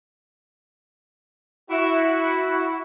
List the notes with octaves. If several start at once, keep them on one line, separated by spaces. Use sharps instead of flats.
E4 F#4